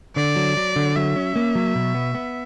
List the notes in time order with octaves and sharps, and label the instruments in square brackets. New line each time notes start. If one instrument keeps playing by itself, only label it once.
[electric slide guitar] D3 [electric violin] D5
[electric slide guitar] F#3
F#3
D3
[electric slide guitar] F#3 [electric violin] E5
[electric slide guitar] C#4
A#3
F#3
B2
B3
B3